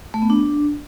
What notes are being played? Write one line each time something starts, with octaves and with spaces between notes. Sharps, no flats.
A3
B3
D4